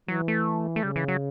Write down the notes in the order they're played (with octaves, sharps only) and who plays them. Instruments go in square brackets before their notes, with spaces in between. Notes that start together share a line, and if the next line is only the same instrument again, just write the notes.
[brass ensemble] E3 [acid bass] F#3
[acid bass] A3
A3
[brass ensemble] C#3 [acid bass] G3
[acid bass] E3
F#3